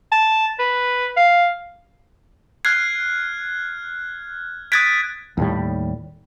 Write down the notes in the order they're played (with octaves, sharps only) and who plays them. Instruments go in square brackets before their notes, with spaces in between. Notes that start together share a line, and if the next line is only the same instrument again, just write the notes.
[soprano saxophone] A5
B4
F5
[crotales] F6 F#6 G#6 [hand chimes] C7
[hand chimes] D#6 A6 B6 [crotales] F#6 G#6 D7
[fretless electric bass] D#2 A2 G3